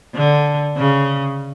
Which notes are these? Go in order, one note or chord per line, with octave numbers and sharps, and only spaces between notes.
D3
C#3